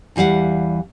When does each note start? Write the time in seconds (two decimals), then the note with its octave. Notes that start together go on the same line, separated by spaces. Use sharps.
0.16 E2 E3 G3 F5 F#5